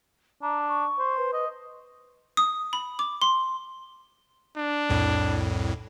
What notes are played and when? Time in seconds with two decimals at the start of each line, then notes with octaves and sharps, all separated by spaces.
0.42 D4 A#5
0.69 C#6
0.99 C5
1.18 B4
1.33 D#5
2.37 D#6
2.73 B5
2.99 D6
3.22 C6
4.57 D4
4.90 C2 F2 A2